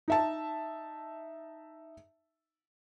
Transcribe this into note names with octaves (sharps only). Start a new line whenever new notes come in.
D#4 E5 A5